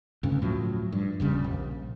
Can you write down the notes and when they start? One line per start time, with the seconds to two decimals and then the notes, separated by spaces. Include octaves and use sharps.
0.23 D2 G2 C#3 C#4
0.42 A2 F3 F#3
0.92 G2
1.20 D#1 F2 C#3 G3
1.44 A#1